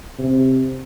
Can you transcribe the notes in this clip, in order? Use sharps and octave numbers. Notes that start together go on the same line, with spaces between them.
C3